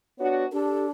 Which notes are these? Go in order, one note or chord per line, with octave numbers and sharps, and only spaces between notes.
B3 D4 F#4 C#5
D4 G4 A4